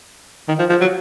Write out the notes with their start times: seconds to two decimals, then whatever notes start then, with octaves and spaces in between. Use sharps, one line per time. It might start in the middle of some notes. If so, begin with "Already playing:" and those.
0.48 D#3
0.59 F3
0.70 F3
0.81 F#3